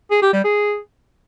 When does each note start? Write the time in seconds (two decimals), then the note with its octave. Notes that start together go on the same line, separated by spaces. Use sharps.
0.11 G#4
0.22 G4
0.33 G3
0.44 G#4